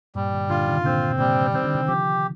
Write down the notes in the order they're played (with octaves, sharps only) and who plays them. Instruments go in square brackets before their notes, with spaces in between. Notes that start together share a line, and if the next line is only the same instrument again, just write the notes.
[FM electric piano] G2 A#2 [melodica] G3
[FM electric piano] A#2 D3
[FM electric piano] A#2 D3 [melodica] F4
[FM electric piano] C3 D#3
[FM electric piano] A#2 D3 [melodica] C4
[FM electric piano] C3
[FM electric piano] A#2 D3 [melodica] G3
[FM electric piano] D#3 [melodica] C4
[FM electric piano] D3
C3 D#3
[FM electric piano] D3 F3 [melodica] G4